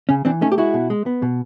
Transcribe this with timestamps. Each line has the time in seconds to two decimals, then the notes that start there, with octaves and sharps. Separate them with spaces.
0.09 C#3 C#4
0.25 E3 C4 D4
0.41 A3 C#4 D#4
0.52 G4
0.58 G#3 E4 F#4
0.74 B2
0.90 G#3
1.06 B3
1.22 B2